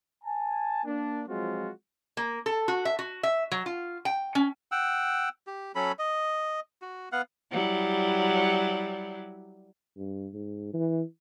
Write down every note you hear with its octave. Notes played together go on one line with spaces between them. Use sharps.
G#5 A5
A#3 D4
F3 F#3 G#3 C4 F4 F#4
A#3
A4
F#4
E5
F#4
E5
F#3
F4
G5
C#4
F#5 G5 E6
G4
F#3 C#4 A4 B5
D#5
F#4
B3 F5 F#5
F#3 G3 E4
G2
G#2
E3